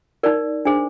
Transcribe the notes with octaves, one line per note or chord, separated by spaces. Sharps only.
D#4 A#4 D5
D4 G#4 C5